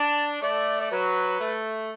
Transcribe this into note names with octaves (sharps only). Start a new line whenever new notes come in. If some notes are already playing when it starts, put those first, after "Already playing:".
Already playing: D4 A5
A3 D5
D5
F#3 B4
A3